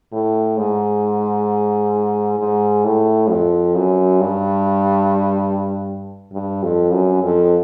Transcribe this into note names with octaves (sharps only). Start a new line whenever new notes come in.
A2
G#2
G#2
A2
F2
F#2
G2
G2
F2
F#2
F2